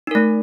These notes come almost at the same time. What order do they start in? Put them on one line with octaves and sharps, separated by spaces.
D#4 A#4 A3